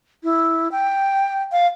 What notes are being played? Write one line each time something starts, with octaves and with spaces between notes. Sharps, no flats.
E4
G5
F5